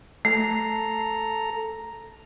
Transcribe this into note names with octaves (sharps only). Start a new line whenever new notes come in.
A3 A4 A#5